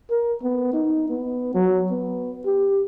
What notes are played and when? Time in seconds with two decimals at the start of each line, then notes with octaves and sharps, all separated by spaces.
0.11 A#4
0.43 B3
0.73 D#4
1.09 B3
1.55 F#3
1.91 B3
2.46 G4